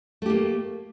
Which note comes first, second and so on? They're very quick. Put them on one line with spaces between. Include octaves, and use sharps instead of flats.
A3 G4 A#3